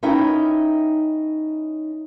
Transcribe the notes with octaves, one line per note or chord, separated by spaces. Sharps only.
C#4 D#4 E4 A#4 E5 G5